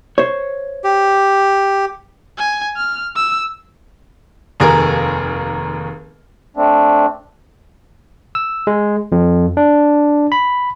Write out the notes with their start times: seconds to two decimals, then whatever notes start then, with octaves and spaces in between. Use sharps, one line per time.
0.18 C5 C#5
0.84 G4
2.38 G#5
2.77 F6
3.16 E6
4.60 F1 D#2 G#4 A#4
6.57 A3 C4 D4
8.35 E6
8.67 G#3
9.12 F2
9.57 D4
10.32 B5